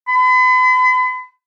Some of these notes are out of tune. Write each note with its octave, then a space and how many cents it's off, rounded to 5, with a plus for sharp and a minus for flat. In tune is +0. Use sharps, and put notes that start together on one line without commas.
B5 +40